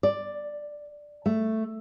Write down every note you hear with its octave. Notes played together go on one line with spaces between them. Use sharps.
D5
A3